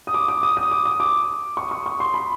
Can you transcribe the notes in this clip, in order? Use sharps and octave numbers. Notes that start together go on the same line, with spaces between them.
D#6
D6
D6
D#6
D#6
D6
D#6
D6
C#6
C#6
C#6
C6
B5